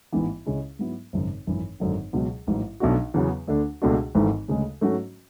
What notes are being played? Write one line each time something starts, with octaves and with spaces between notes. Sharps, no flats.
A1 G#2 E3 B3
C#2 C#3 G#3 C#4 E4
G#2 F#3 B3 E4
G#1 F#2 C#3
G#1 F#2 E3
G#1 F#2 D3 F#3
C#2 B2 F#3
A1 G#2 F#3
B1 B2 A3 D4 F#4
E2 C#3 F#3 B3
D2 D3 A3 D4
C#2 B2 A3 D4 F#4
G#1 G#2 E3 A3
D2 C#3 G#3
G#2 F#3 A3 C#4 F#4